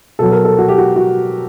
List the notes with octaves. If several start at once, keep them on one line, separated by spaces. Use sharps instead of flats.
B2 F#3 A4
A#4
A4
F#4
G4
F#4
F#4